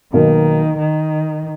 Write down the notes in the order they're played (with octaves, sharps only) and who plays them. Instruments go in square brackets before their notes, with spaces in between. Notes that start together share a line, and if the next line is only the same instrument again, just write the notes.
[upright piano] B1 B2 A#3 D#4 A#4 [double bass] D#3
[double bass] D#3